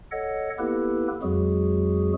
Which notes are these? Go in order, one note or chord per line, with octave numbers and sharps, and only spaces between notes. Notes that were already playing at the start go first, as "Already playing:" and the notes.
A4 C#5 D#5 F#5
A#3 B3 E4 G4 A4 B4
F2 F#3 G#3 F#4 G#4